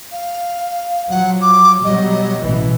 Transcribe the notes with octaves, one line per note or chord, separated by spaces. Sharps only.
F5
F3 F#3 F#5
D6
B2 F#3 G3 D#5
A1 B2 E3